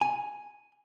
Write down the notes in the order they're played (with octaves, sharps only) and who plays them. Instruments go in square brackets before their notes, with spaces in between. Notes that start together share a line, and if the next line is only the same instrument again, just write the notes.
[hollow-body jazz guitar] G#5